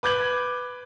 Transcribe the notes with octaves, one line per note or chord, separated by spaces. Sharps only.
B4 D6 G6 G#6 F#7